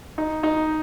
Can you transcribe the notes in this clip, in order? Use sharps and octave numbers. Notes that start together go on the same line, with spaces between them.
D#4
D#4